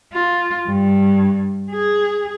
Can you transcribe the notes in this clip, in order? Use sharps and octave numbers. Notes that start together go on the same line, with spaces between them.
F4
G2
G#4